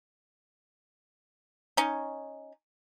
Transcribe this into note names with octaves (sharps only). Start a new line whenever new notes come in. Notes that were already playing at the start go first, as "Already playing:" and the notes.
C#4 D#4